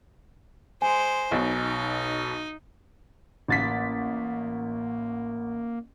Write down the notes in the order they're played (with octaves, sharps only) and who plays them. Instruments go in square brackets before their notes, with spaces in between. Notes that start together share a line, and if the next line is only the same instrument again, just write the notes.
[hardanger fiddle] G#3 C5 [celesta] G#5
[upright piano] B1 B2 [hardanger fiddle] D#4
[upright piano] A1 A6 B6 [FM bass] A#3